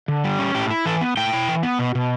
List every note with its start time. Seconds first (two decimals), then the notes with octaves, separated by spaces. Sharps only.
0.08 D3
0.24 G3
0.39 C#4
0.55 A2 G4
0.70 E4
0.85 E3 A4
1.01 B3
1.17 A2 G5
1.33 E4
1.48 E3
1.63 B3
1.79 B2
1.95 B2